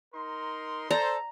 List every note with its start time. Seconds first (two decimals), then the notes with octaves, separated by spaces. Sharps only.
0.14 D#4 A#4 C6
0.91 A4 C5 D5 A#5